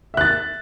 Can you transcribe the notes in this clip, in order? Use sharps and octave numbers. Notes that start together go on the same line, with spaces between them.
E5 F#6 A6